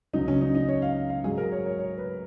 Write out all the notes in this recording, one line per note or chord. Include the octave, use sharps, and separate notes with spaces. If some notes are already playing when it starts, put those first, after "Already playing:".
C#2 C#3 F#3 D#4
C#4
D#4
D#4
C#5
F5
F5
G#2 F#3 G#4
A#4
C#5
C#5
C#5
B4